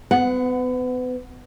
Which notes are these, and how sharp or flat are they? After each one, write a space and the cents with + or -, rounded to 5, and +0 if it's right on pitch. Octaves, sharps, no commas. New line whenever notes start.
B3 +35 F#5 +0